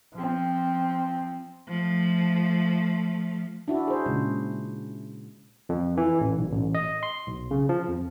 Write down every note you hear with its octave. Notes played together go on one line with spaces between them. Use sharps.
F3 C4
F3 A3
D4 E4 F#4
G#4 C5
A#2 C#3 G#3
F2
E3
A1
B1
A1
D#5
C6
B1
C#3
F3
F2